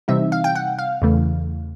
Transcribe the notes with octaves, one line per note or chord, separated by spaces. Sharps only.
C3 E3 G3 C4 D#4 E5
F5
G5
F#5
F5
E2 C#3 E3 A3